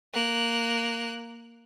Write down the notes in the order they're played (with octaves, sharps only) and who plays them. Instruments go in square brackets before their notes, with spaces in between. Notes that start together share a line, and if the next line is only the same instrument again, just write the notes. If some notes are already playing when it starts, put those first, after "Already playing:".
[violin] A#3 F#6